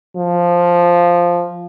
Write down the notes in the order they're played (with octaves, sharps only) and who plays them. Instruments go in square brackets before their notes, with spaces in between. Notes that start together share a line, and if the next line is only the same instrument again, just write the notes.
[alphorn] F3